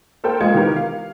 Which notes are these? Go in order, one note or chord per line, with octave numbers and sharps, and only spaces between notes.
A#3 A4 A#4 C5 G5
A#1 G#3 F4 D#5 G#6 C#7
D#3 E3 B3 G4 A#4
F5